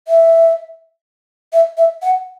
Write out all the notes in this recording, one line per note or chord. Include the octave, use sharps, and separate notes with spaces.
E5
E5
E5
F#5